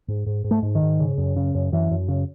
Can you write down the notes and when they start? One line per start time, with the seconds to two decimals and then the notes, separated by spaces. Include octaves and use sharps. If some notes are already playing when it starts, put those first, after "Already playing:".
0.08 G#2
0.26 G#2
0.44 G#2
0.51 A3
0.62 G#2
0.75 D#3
0.82 G#2
1.00 C#3
1.18 F#2
1.36 C#3
1.55 F#2
1.72 F#2 E3
1.91 F#2
2.08 C#3